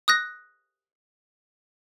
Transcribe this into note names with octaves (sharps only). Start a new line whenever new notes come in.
D#6 F#6 A#6